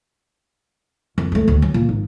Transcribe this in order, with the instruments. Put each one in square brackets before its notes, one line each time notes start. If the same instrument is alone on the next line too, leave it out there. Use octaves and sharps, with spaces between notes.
[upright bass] F2
G#3 A3
D2
F#3
A#2
G#1